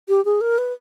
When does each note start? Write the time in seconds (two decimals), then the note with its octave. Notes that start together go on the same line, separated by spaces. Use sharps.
0.09 G4
0.25 G#4
0.41 A#4
0.58 B4